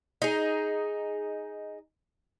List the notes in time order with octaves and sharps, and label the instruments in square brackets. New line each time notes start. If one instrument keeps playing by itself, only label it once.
[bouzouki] D#4 G#4